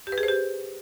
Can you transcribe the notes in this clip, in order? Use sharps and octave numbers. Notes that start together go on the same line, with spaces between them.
G4
B4
G#4
C5
G4